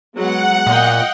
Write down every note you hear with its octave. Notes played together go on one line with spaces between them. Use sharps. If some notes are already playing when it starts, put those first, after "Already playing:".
F#3 G#3 B3 F#5
A#2 D#5 F5 G5